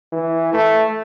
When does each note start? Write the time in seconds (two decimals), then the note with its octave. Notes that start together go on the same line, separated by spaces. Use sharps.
0.12 E3
0.53 A3